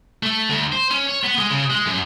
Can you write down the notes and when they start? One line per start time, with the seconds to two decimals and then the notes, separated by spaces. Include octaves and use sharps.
0.23 A3
0.49 D2
0.72 C5
0.91 C#4
1.07 C#5
1.24 B3
1.38 G#3
1.50 C#3
1.70 G#3
1.87 F#2